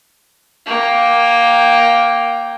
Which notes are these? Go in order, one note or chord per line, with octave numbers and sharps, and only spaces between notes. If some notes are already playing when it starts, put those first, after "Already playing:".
A#3 G5